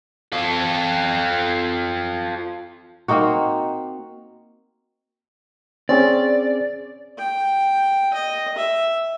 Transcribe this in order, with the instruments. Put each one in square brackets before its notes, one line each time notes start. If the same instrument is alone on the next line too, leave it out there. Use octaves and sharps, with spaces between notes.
[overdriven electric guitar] F4 A4
[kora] A#3 C4 D#4 F#4
[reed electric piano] C4 C#4 G#4 [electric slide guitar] D5
[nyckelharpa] G5
D#5
E5